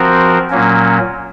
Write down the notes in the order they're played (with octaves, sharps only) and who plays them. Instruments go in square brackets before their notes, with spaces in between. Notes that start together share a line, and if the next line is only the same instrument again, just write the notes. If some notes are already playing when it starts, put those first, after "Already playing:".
Already playing: [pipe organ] F3 C4 F#4 A#4
A#2 F#3 A#3 C#4